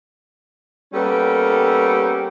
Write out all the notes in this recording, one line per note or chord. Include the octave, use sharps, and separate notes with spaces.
G3 A#3 B3 C#4 G4 A4